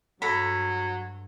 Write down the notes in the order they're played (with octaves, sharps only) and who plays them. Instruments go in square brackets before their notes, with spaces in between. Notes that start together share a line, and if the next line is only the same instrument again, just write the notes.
[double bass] G2 [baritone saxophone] F#3 [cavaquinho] A4 A#5 B5